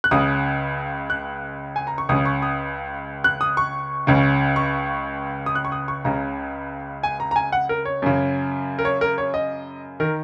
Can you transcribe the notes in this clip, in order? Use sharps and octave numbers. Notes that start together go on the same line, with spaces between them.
F#6
C#2 C#3 D#6
F#6
G#5
A#5
C#6
C#2 C#3 D#6
C#6
D#6
F#6
D#6
C#6
C#2 C#3
C#6
D#6
F#6
C#6
D#6
C#6
C#2 C#3 A#5
G#5
A#5
A#5
G#5
F#5
A#4
C#5
F#2 C#3
A#4
C#5
A#4
C#5
D#5
D#3 A#4